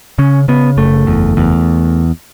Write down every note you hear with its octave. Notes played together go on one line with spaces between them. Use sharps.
C#3 C#4
C#3 B3
F#1 A3
E2
E2